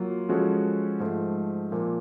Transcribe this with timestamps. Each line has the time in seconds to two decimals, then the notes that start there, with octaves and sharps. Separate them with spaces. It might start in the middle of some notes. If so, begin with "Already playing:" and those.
Already playing: F#3 A#3 F4
0.29 F3 G#3 C#4 F#4 A4
1.00 G#2 F3 A3
1.72 A#2 F3 A#3